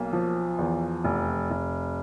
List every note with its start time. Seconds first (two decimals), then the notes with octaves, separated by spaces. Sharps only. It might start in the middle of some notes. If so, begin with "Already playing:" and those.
Already playing: B1 A#3
0.13 F3
0.59 E2
1.04 F1
1.50 F1